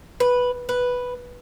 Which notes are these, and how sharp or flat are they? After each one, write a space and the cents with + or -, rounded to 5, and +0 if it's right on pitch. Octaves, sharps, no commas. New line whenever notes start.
B4 -5
B4 +0